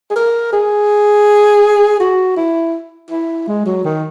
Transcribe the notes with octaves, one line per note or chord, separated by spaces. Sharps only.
G#4
A#4
G#4
F#4
E4
E4
G#3
F#3
D#3